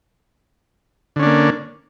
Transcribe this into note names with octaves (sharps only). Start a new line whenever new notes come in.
D3 A#3 C#4 D4